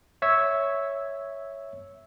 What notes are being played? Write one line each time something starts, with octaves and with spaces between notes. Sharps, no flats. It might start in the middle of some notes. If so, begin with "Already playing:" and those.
C#5 E5 C#6 E6 G#6